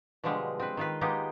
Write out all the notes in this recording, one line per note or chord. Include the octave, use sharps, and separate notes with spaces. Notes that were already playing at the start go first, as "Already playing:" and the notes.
B2 D3 F3 G3 G#3
C4 B4
D#3 F4 B4
G#3 A#3 B3 D#4 G4